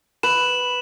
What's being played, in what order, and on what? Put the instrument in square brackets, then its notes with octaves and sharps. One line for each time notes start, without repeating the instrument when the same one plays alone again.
[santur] B4 [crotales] E7 F#7